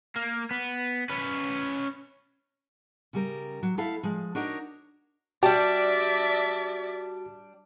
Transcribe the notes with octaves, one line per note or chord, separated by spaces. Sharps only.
A#3
B3
C#4 B4
C#3 G3 A#4
F#3
A3 E4 A4 F5
F3 G#3
D4 D#4 F#4 A#4 C#5
G3 D4 F#4 G4 D5 E5